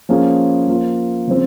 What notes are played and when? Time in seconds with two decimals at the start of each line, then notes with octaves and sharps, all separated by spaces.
0.09 F3 A#3 C#4 F4 G#4
0.67 F3 A#3 F4
1.27 C#3 F3 C4